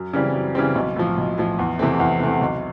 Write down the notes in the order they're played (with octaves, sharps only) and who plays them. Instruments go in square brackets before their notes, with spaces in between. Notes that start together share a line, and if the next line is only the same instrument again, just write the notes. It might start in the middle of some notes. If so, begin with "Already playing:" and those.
Already playing: [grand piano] F#2
C#3 E3 G3 C4
F#2
C#3 E3 G3 C4
B1
A2 F3
B1
A2 F3
E2
C3 E3 A3 C4
E2
C3 E3 A3 C4
B1